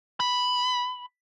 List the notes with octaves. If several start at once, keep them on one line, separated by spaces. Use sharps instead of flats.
B5